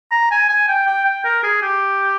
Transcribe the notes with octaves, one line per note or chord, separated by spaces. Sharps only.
A#5
G#5
G#5
G5
G5
G5
A#4
G#4
G4